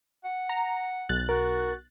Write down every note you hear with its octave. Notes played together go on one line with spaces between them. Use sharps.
F#5
A#5
B1 F#6 A6
F#4 A#4